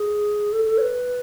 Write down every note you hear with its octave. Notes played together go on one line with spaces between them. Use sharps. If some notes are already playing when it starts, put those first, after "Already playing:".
Already playing: G#4
A4
A4
C#5
B4